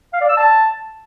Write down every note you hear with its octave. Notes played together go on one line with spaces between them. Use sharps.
F5
D5
E6
A5